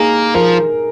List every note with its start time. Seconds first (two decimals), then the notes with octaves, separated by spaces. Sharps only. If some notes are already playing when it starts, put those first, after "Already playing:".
Already playing: A#3 D#4 G#4
0.35 F3 A#4